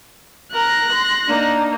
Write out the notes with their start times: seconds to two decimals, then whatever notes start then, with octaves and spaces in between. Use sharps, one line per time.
0.54 A#4 F#6 A#6
0.92 C6
1.29 A#3 D4 D#4